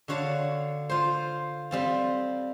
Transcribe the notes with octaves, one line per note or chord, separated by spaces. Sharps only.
D3 F#4 C#5 F5 A5
F4 C5
G3 C4 F4